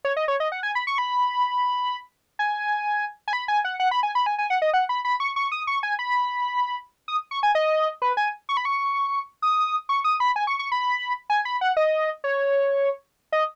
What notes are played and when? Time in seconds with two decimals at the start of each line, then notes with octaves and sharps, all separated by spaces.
0.05 C#5
0.17 D#5
0.28 C#5
0.40 D#5
0.52 F#5
0.63 G#5
0.75 B5
0.87 C#6
0.98 B5
2.39 G#5
3.28 G#5
3.33 B5
3.48 G#5
3.65 F#5
3.80 F#5
3.91 B5
4.03 G#5
4.15 B5
4.26 G#5
4.38 G#5
4.50 F#5
4.62 D#5
4.74 F#5
4.89 B5
5.05 B5
5.20 C#6
5.36 C#6
5.52 D#6
5.67 C#6
5.83 G#5
5.99 B5
7.08 D#6
7.31 C#6
7.43 G#5
7.55 D#5
8.02 B4
8.17 G#5
8.49 C#6
8.57 B5
8.65 C#6
9.42 D#6
9.89 C#6
10.04 D#6
10.20 B5
10.36 G#5
10.47 C#6
10.59 C#6
10.72 B5
11.30 G#5
11.45 B5
11.61 F#5
11.77 D#5
12.24 C#5
13.32 D#5